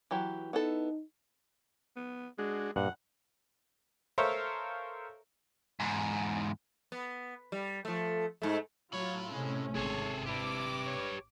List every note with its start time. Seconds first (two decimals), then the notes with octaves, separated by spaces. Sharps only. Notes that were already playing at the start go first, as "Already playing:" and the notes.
0.11 E3 F#3 G4
0.53 B3 D#4 E4 A4
1.96 B3
2.38 G#3 D4 F#4 G#4
2.76 G2 A#2 F#5
4.18 A4 A#4 C5 C#5 E5 F5
5.80 E2 G#2
6.92 B3
7.52 G3
7.85 F3 A3
8.42 G#2 A3
8.93 A2 F#3 F4 C#5 B5
9.31 C3 G#3 A3 C#4
9.75 G#1 C3 G#4 A4 C#5
10.26 E4 G4 B4 D6
10.86 C#5